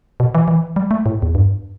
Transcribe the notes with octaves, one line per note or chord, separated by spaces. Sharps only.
B2
E3
E3
G3
A3
A2
E2
G2